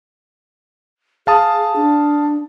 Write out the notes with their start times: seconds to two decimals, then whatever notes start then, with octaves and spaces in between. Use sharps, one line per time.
1.27 G#4 F5 A5 D#6
1.76 D4